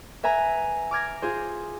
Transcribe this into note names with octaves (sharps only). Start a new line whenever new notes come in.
B4 E5 G#5 A#5
D6 F6 G#6 A#6
F4 G#4 C5